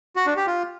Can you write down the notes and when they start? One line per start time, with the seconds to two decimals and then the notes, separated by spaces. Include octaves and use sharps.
0.16 F#4
0.26 D4
0.36 G4
0.47 F4